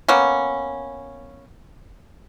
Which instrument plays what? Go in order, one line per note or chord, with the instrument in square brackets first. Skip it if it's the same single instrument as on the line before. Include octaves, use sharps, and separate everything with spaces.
[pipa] A#3 B3 C#4